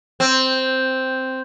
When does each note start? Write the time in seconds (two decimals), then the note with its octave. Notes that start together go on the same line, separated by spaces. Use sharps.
0.20 C4